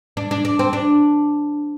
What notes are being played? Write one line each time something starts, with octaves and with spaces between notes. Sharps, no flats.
D4
D4
D4
C4
D4